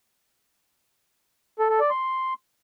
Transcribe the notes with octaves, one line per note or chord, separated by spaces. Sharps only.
A4
A4
D5
C6